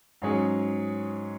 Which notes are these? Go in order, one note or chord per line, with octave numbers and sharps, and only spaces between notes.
G#2 F#3 C#4 G#4